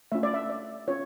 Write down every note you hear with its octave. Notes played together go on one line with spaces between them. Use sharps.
A3 C#4 F4 E5
D5
E5
D5
C#4 F4 C#5